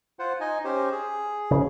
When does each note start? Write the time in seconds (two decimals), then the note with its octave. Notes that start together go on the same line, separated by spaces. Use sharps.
0.19 F4 C5 F#5
0.40 D#4 D#5 G#5
0.65 C#4 G4 C5
0.92 G#4
1.51 C#3